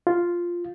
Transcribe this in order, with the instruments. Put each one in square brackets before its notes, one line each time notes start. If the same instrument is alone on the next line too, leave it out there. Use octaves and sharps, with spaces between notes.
[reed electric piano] F4